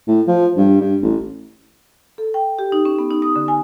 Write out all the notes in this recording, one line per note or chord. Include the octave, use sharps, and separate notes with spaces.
A2
F3
G2
G2
A1
A4
G5
G4
D#4
C#4
B3
D#4
D#6
D3
G#5